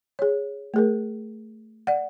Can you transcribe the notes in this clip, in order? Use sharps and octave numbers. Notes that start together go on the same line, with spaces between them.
G#4 C#5
A3 G#4 A#4
D5 F#5